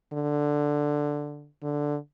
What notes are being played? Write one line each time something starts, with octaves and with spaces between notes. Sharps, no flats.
D3
D3